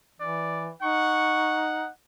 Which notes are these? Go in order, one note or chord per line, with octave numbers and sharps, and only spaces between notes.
E3 D5
D#4 F#5 C#6